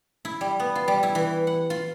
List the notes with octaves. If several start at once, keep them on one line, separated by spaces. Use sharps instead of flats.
E4
G3
B3
F4
G3
E4
E3
F#5
F4